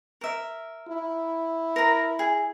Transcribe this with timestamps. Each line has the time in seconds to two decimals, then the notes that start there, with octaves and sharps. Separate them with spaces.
0.21 A#4 E5
0.89 E4
1.76 A#4 A#5
2.19 G#4